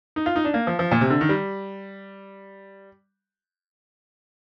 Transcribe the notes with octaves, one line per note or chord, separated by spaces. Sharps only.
D#4
F4
D#4
D4
A#3
F3
F3
A#2
C3
D3
D#3
G3